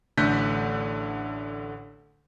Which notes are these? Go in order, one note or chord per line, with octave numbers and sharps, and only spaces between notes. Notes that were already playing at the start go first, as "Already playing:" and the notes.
A1 D3 A3 F#6 G6 B6